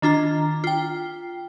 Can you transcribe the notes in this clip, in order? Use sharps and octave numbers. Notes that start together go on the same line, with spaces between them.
D#3 D4 F4 A#5
F4 G5